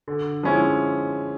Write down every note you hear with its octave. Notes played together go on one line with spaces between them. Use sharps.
D3
F3 G#3 C#4 E4